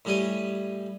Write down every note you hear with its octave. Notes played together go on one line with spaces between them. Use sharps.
A2 G3 G4 G#5 D#6